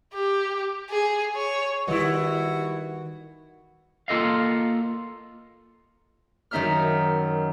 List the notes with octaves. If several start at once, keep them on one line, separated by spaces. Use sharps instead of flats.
G4
G#4
C#5
D#3 G3 E4 F#4 B4 D#5
A#3 F4 A4 D#5 F5
F#2 D#3 D#4 E5 A#5 F6